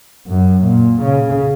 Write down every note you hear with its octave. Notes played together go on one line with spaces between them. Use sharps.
F#2
A#2
C#3